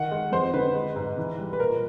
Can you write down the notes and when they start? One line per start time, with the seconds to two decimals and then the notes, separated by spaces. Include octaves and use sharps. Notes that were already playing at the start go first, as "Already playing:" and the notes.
Already playing: D#3 F#5
0.11 G#3
0.32 F2 C5
0.54 D3 B4
0.75 G#3
0.96 G#2
1.18 E3
1.38 G3
1.53 B4
1.59 A#2 A#4